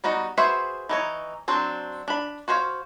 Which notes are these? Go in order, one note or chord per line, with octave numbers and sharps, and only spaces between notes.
G3 B3 D#4 F#4
F#4 G#4 B4 C5 E5
E3 D#4 C#5
F#3 C4 D4
D4 B5
F#4 C5 C#5 D#5 F5